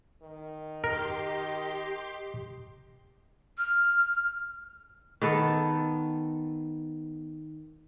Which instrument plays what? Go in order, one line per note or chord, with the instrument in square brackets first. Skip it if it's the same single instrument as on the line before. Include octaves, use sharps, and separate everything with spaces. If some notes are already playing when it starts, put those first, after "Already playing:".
[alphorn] D#3
[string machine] G4 C6 [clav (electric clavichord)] A#4 [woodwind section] D#5
[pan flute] F6
[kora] D#3 B3 A4